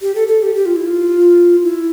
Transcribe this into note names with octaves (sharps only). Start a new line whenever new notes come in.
G4
A4
A4
G4
G4
F4
E4
F4
E4